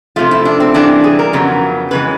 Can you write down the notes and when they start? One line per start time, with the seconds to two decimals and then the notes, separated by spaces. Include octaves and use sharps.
0.16 C3 F3 A3 F4
0.31 E4
0.45 D4
0.60 C4
0.74 C3 E3 G3 A#3 D4
1.04 G#4
1.19 A#4
1.33 F2 C#3 F#3 B3
1.91 F2 C#3 E3 G#3 B4